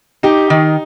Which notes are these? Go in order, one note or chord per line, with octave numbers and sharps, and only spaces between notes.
D#4 G4
D#3